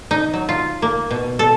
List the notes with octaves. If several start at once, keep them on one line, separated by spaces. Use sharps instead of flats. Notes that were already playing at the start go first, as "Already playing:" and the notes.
D#4
F#3
F4
A#3
B2
A4